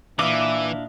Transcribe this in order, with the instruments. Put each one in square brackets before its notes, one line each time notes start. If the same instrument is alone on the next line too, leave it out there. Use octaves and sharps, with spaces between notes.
[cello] A#2 E4 [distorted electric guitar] E3 [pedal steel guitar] D4 D#5 F5 [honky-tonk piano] D6